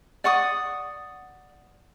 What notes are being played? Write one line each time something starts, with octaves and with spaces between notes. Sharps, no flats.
D5 F#5 C#6 D#6